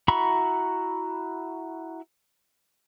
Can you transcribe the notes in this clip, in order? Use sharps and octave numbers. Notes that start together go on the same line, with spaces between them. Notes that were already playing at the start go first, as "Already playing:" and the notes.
E4 F#4 A#5 B5 C#6